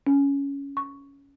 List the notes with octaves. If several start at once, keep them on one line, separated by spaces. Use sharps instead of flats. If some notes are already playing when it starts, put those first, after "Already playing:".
C#4
C#6